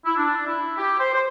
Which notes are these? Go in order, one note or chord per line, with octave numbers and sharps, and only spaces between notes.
E4
D4
E4
G4
C5
C5